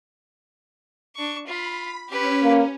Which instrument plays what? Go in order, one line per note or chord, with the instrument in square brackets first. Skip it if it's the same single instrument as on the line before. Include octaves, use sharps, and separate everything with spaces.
[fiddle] D4 C#6
[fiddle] F4 [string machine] B5
[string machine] C#4 [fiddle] G4 B4
[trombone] A#3